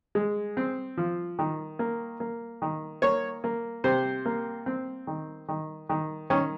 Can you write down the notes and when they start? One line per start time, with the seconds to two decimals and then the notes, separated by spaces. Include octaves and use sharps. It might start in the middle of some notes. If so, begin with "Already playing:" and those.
0.15 G#3
0.57 C4
0.97 F3
1.39 D#3
1.79 A#3
2.20 A#3
2.62 D#3
3.02 A#3 C#5
3.44 A#3
3.84 C3 C5
4.25 A#3
4.66 C4
5.07 D#3
5.49 D#3
5.89 D#3
6.30 D#3 C#4